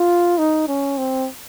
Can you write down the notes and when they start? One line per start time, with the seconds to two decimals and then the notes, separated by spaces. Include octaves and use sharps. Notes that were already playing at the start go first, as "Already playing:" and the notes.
Already playing: F4
0.38 D#4
0.68 C#4
0.98 C4